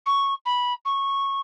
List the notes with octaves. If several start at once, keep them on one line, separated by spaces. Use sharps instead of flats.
C#6
B5
C#6